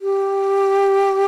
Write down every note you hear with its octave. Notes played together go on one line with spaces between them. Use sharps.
G4